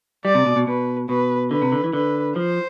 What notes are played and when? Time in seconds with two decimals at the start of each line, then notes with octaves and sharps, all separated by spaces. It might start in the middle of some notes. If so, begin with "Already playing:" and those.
0.25 G3 D5
0.35 C3
0.46 B2
0.56 B2
0.67 B2 B4
1.09 B2 B4
1.51 D3 B4
1.62 C3
1.72 D3
1.84 E3
1.93 D3 B4
2.36 F3 C5